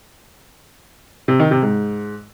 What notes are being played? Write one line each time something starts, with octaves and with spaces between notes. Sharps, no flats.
C3
D#3
C3
G#2